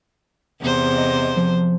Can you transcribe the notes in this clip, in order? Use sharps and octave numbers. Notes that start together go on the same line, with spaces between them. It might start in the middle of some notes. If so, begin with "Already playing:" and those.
E2 C3 C5
D#5
F3